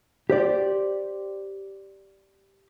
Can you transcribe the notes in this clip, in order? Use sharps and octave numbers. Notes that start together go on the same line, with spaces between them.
G4 C5 D5